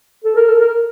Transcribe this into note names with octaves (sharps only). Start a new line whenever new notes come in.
A4
A#4
A4
A#4